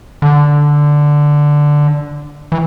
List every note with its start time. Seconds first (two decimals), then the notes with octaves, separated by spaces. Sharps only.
0.22 D3
2.52 E3